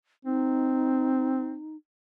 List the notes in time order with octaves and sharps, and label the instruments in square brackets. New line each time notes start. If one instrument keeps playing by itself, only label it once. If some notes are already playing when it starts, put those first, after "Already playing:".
[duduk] C4 [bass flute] D#4